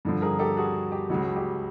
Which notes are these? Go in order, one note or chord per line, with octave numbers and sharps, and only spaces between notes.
G2 D3 F3
G#4 A#4
G4 A4
F#4 G#4
G4
C#2 C#3 F#3 F#4
G4